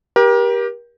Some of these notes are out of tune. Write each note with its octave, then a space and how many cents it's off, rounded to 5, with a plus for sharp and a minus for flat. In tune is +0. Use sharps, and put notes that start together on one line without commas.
G4 +5 A#4 +35